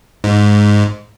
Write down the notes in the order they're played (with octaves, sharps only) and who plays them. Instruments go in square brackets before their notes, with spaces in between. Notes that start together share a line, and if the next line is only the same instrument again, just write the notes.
[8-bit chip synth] G#2